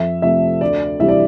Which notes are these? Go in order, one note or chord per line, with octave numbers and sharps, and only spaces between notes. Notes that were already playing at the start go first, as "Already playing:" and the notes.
Already playing: F2 E5
C3 F3 A3 E5
D2 D5
C3 E3 G3 E5
D5